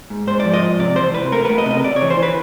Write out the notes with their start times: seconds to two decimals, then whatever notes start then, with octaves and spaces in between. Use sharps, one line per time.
0.10 G#2
0.27 G#2 C5
0.40 D5
0.45 F3
0.54 D#5
0.62 G#2
0.79 C3 D5
0.96 E3 C5
1.14 C3 B4
1.32 A3 A#4
1.45 B4
1.49 A3
1.58 D#5
1.66 C3
1.71 D#5
1.84 C3 D5
1.96 C#5
2.02 E3
2.10 C5
2.18 E3 B4